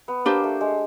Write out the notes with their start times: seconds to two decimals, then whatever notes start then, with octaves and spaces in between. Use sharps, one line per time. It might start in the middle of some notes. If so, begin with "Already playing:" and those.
0.08 B3
0.25 A#3 D4 G4 C5
0.44 A3
0.61 G#3